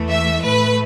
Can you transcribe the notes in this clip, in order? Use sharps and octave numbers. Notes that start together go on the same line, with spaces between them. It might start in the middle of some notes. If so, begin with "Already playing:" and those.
Already playing: E2 E3 A3
E5
A2 A3 B4